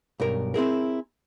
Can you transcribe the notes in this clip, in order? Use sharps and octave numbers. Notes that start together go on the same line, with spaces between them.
B1 G2 A#4
C4 E4 G#4 A#4